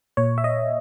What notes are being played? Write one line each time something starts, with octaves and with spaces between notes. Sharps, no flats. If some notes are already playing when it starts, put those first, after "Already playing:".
A#2 C#5
E5
D#5